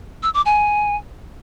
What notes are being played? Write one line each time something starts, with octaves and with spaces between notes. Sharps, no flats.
E6
D6
G#5